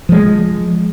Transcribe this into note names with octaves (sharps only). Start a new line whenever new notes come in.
F3 G#3